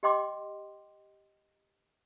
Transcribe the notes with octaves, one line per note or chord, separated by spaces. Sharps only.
G4 D#5 G5 C6 D6